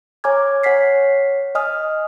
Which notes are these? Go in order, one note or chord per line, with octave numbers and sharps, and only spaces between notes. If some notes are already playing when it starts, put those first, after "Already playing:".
C#5 G#5 A#5 D6 F6 G#6
C#5 F#5 F6 B6 C7
D#5 G#5 D#6 F6